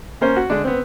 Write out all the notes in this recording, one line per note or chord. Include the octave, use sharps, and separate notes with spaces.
A#3 C#4 C5
F#4
D3 G#3 D4
B3 C4